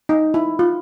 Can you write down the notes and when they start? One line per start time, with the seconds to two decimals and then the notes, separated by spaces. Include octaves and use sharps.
0.09 D#4
0.34 E4
0.59 F4